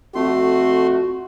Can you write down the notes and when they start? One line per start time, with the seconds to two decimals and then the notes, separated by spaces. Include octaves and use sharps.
0.15 F2 A3 F#4 C6